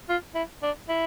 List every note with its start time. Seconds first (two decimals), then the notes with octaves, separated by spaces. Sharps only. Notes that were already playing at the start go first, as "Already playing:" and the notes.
0.09 F4
0.34 E4
0.62 D4
0.89 E4